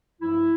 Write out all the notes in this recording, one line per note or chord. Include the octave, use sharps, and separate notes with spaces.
G2 F3 A3 E4